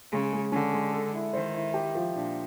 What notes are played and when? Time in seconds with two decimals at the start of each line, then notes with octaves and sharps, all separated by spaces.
0.12 C#3 G#3
0.33 G#3
0.52 D3 C#4
0.73 G#3
0.93 A4
1.13 E4
1.33 D#3 C5
1.54 E4
1.74 G4
1.95 F3
2.15 A#2 D4